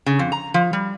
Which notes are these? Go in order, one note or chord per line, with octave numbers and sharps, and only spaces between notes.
C#3
F2
A#5
F3
G3